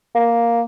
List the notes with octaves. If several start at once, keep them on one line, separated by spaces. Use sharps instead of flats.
A#3